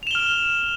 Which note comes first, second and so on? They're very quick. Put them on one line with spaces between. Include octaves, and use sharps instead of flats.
F7 E7 G7 F6